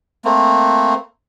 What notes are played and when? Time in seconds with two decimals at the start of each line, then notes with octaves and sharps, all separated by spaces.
0.25 A3 A#3 C4